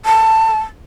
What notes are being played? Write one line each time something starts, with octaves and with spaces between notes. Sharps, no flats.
A5